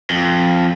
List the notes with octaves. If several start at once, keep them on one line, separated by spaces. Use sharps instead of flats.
F2